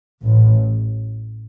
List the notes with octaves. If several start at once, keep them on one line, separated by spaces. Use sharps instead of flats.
A1 A2